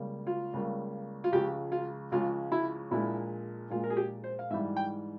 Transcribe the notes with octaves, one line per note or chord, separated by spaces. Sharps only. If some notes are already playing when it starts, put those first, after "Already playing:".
Already playing: C#2 C#3 G3 A#3
F4
C#2 C#3 G3 A#3
F4
C#2 C#3 F3 G#3 G4
F4
C#2 C#3 F3 G#3 F4
E4
A#1 A#2 G#3 E4
A#1 A#2 G#3 F4
A#4
G#4
G4
C5
F5
G#2 E3 G3 E5
G5